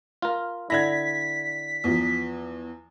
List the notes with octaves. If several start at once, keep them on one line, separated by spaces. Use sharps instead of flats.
F4 A#4
D3 E4 G#6 A#6 B6
E2 F3